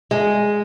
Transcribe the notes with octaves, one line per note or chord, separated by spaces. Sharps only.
G#3